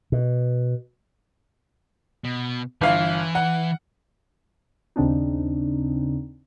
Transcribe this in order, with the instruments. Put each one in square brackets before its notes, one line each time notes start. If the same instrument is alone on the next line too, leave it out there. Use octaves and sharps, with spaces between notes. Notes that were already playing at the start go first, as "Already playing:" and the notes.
[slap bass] B2
[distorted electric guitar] B2
[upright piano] G1 F5 [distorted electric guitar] E3
[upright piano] F#5
[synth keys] D#2 C#3 C4 D4 D#4